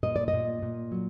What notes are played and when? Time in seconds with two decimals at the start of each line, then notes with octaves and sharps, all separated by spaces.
0.03 A#2 D#5
0.16 D5
0.28 D#5
0.33 A#2
0.62 A#2
0.92 F#3